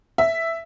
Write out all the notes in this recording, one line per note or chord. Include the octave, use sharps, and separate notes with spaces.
E5